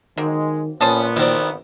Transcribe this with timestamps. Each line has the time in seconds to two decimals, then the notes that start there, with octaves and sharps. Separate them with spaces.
0.17 D#3 F#3 G#3 A#3 C4
0.81 A#1 A#2 B3 C#4 C5 G#5 A5 D#6
1.16 D#3 F#3 C4 D5